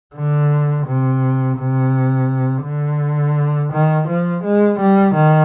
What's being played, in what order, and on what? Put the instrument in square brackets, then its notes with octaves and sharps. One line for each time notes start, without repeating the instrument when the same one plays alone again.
[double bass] D3
C3
C3
D3
D#3
F3
G#3
G3
D#3